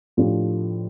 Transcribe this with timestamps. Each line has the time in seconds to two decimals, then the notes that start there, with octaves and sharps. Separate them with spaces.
0.17 A2 F3 A3 D4 G4